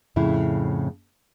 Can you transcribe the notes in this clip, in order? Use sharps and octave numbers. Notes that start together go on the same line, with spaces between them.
F2 A2 C#3 E4